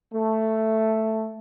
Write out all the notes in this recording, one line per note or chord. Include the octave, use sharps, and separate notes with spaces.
A3